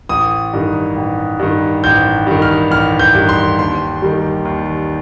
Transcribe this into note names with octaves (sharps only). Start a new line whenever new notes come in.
A1 D#6
G2 D#3
A1
G2 D#3
A1 G6
G2 D#3
F6
A1 F6
G6
G2 D#3
C6
D#2 C6
D#3 G3
D#2